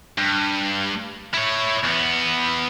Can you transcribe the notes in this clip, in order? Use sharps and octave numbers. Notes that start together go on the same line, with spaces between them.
G2
E4 C#5
E2 B3